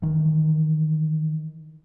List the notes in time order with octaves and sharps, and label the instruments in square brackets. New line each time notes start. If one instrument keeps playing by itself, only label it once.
[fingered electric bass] D#3 E3